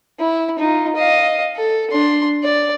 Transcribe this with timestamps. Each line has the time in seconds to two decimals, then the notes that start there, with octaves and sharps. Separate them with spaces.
0.19 E4
0.59 D#4 F4
0.95 D#5 F5
1.56 A4
1.91 D4 C6
2.43 D5